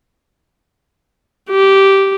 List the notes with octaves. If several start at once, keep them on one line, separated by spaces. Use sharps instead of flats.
G4